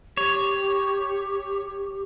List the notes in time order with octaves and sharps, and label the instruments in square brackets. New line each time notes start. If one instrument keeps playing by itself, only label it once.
[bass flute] G4 [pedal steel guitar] C#5